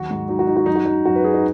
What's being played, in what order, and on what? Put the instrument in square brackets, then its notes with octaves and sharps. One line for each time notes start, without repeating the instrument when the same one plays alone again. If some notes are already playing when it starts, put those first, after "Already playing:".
Already playing: [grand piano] D#2 F#3 F#4
G#2
F#3 D#4
F#4
F#3 D#4
F#4
F#2 D#4
F#4
F#3 D#4
F#2 F#4
B4
F#3 G#4
D#4